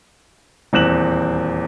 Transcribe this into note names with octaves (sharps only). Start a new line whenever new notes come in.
D#1 E2 C4 F#6 E7 F#7